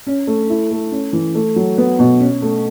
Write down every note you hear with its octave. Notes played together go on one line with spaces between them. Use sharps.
C#4
A3
E4
A3
C#4
E3
A3
F#3
B3
B2
C#4
A3